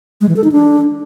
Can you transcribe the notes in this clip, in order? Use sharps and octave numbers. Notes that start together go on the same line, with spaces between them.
G#3
E3
A4
D#4
D4